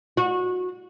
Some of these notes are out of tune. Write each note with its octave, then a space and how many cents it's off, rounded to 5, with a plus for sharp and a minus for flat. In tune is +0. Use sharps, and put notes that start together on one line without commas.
F#4 -25